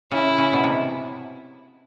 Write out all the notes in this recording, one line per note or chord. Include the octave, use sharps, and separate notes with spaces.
C#3 E4
C#3
B2
C3